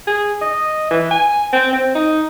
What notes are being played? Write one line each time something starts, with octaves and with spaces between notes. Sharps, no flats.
G#4
D#5
E3
G#5
C4
C4
D#4